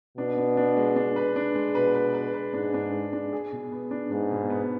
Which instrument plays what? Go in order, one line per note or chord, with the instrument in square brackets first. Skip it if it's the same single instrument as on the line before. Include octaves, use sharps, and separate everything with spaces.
[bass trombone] B2 [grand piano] D4
[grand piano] D4
D4
G#3
D4
B4
D4
G#3
[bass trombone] B2 [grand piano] B4
[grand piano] B4
B4
B4
[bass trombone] G#2 [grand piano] D4
[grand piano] D4
G#3
D4
G#4
B2
B3
D4
[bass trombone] G#2 [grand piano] D4
[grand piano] B2
B3